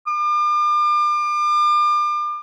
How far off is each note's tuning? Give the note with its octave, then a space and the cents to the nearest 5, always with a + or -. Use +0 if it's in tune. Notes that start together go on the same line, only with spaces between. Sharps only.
D6 +40